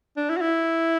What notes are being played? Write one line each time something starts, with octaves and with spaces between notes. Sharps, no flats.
D4
E4
F#4
E4